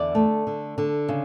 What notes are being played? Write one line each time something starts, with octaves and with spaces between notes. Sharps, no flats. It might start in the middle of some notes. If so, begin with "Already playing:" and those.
Already playing: E2 D3 D5
A3
D3
D3
C#3